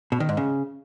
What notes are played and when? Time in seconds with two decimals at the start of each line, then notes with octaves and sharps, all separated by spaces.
0.12 B2
0.20 D#3
0.29 G#2
0.37 C#3